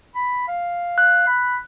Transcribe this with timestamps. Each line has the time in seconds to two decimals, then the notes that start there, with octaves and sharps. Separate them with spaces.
0.15 B5
0.48 F5
0.98 F#6
1.27 B5